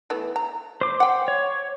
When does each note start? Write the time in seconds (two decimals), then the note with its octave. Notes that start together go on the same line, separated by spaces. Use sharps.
0.10 E3 A3 B3
0.36 A#5
0.81 C5 D6
1.00 F#5 G5
1.28 C#5